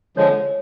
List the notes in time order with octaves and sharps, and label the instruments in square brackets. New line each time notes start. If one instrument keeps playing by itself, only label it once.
[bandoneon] D3 F3 G#3 [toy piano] C#5